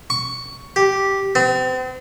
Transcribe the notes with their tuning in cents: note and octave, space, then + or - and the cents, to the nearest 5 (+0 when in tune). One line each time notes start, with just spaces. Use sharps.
C#6 +10
G4 -5
C4 -40